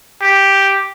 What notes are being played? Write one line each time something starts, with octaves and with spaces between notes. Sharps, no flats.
G4